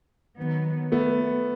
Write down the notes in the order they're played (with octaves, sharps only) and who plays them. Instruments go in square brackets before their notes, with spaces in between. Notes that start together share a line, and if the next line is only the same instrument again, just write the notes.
[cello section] D#3 F#3 B3
[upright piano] A3 B3